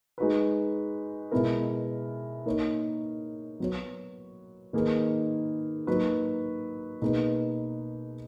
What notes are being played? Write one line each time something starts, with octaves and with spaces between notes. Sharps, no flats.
G#3 D#4 F#4 B4
B2 G#3 B3 E4 A#4
A#3 D#4 A#4 C#5
F#3 B3 F#4 C#5
D#3 A#3 D#4 G#4 B4
F#3 A#3 D#4 F#4 B4
B2 A#3 D#4 G#4 B4